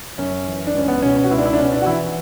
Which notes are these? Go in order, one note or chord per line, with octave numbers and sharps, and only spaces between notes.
F#2 C#4
E3
D4
C#2 C#4
B3
B2 C#4
C#4
F#4
C#2 E4
D4
E4
D4
B2 C#4
D4
F#4
E3 E4